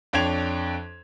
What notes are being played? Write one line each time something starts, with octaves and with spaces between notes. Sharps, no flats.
F2 D4 C#5 G5 G#6 F7